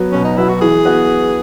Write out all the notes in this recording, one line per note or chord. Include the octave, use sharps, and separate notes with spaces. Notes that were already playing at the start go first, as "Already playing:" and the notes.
Already playing: F#3 B3
B2 C#4
D#4
F#3 B3 E4
F#4
E3 G#4
B3 F#4 B4